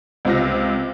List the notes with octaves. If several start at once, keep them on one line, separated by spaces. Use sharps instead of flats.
C#2 C3 F4 A#6